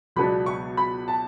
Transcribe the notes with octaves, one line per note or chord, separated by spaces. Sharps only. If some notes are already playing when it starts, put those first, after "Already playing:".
C#2 B2 F#3 B3 D4 B5
C#6
B5
A5